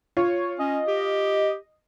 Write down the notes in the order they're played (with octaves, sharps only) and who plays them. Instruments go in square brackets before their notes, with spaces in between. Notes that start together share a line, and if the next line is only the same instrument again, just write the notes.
[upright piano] F4 [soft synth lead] C#5
[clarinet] C#4 [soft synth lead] D#5
[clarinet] G4